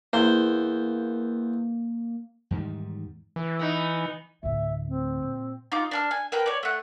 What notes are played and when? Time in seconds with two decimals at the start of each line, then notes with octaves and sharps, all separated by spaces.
0.13 E2 A#3 C5
2.51 E2 G#2 D#3 G3
3.36 E3
3.59 B3 D#4
4.43 D2 A2 E5
4.88 C4
5.22 A#2
5.72 D#4 F4 D6
5.91 D4 A5 F6
6.11 G#5
6.32 A#4 B4 G5 A5
6.46 C#5 D5
6.63 A3 F#5